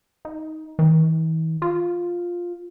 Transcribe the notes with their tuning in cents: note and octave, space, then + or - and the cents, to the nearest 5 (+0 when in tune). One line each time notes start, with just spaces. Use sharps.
D#4 +15
E3 -45
F4 +5